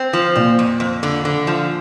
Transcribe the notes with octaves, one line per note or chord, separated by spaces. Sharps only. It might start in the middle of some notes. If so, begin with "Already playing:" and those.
Already playing: C4
F3
A#2 C4
F2
F2
D3
D3
F3